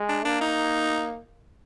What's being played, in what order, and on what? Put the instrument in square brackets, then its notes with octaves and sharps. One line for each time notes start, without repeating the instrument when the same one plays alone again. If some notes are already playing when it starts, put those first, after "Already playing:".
Already playing: [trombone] G#3
[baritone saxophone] D4
[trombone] A#3 [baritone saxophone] D4
[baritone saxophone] D#4